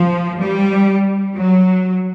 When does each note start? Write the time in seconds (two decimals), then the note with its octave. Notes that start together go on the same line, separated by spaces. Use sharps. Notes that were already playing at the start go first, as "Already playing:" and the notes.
Already playing: F3
0.39 G3
1.36 F#3